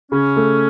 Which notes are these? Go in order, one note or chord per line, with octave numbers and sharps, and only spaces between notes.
C#3 C#4
A3